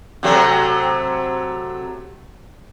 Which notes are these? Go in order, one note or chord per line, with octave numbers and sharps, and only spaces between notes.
C3 F#3 A3